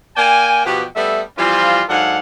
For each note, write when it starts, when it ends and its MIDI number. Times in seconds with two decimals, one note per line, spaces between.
0.17 0.65 58
0.17 0.65 74
0.17 0.65 79
0.17 0.65 80
0.65 0.85 47
0.65 0.85 53
0.65 0.85 59
0.65 0.85 67
0.96 1.21 55
0.96 1.21 57
0.96 1.21 59
0.96 1.21 76
1.38 1.82 52
1.38 1.82 53
1.38 1.82 55
1.38 1.82 60
1.38 1.82 65
1.89 2.20 44
1.89 2.20 54
1.89 2.20 62
1.89 2.20 69
1.89 2.20 77
1.89 2.20 78